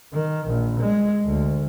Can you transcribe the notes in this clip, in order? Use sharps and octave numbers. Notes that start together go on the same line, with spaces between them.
D#3
A#1
G#3
D2